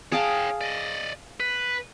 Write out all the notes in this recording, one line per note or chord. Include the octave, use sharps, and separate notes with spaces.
G#4 C#5 F5 G5 A5
D5 D#5
B4